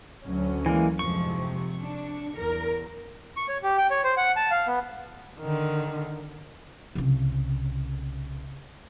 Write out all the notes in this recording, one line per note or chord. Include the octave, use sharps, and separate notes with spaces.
D2 F#3 C#4
E3 G#3 A#3
F2 G#2 C3 F3 C#6
D4
E2 A#4
C#6
C#5
G4
G5
C#5
C5
F#5
A5
F5
B3
D3 D#3
C2 C#3